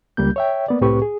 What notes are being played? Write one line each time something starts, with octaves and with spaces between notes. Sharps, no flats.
C#2 G3 A#3 G6
C#5 E5 G5
A#3 B3 D5
C2 A2 C4 G4 B4 C#6
G#4